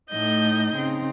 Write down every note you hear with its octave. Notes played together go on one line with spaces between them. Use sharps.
A2 A3 D#4 D#5 G6
C#3 C4 D#4